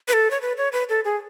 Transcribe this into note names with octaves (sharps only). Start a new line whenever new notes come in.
B4
A4
C#5
B4
C#5
B4
A4
G#4